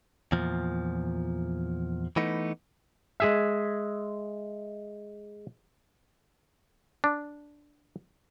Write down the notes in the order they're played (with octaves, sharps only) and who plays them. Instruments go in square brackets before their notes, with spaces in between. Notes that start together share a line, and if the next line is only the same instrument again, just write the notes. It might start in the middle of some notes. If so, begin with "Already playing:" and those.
[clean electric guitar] E2 A#2 F3
E3 A3 B3 D#4
[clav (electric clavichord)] G#3 G#4 E5
D4